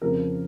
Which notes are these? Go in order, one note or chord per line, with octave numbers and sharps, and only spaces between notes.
F2 C#3 F3 A#4